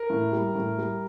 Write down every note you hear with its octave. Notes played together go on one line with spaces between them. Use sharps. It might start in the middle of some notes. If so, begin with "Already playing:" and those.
Already playing: A#4
A2
G3
A2
G3